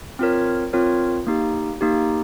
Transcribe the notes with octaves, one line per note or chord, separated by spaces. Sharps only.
C4 F4 A#4 C#5
C4 F4 A#4 C#5
A#3 D#4 G4
A#3 D#4 G4